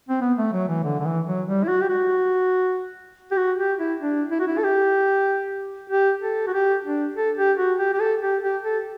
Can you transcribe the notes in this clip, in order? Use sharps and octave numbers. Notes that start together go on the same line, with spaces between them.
C4
B3
A3
F#3
E3
D3
D3
E3
F#3
G3
E4
F#4
G4
F#4
G4
F#4
G4
E4
D4
E4
F#4
E4
A4
G4
G4
A4
F#4
G4
D4
A4
G4
F#4
G4
G4
A4
G4
G4
A4